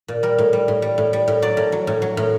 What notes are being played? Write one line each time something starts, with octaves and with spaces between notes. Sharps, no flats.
A#2
G3 A#4
A2
G3
A2
G3
A2
G3
A2
F#3 D5
A2
F#3
A2
F#3
A2